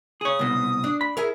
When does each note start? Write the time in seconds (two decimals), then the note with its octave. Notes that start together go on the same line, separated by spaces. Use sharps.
0.21 G#4 C#5 D#6
0.39 C2 B2
0.84 D4
1.01 B5
1.17 E4 G#4 A#4